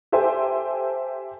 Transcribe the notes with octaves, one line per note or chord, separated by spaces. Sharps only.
G4 A4 C5 E5 G5 G#5